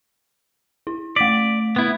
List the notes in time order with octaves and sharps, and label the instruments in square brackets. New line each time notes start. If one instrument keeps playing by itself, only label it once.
[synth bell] E4
[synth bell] A3 B6 [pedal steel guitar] D5
[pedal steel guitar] B3 E4